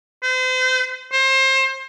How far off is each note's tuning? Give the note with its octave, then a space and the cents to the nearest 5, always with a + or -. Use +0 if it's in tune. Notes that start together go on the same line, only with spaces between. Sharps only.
C5 -35
C5 +30